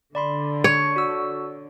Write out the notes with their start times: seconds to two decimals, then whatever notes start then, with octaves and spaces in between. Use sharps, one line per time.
0.15 D3 D5 B5 C6
0.64 C#5
0.96 F#4 E6